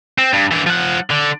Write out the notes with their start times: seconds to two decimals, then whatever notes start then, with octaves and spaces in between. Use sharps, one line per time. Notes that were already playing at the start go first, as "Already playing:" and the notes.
0.18 C4
0.33 G2
0.52 E3 D4
0.66 F3 F#5
1.10 D3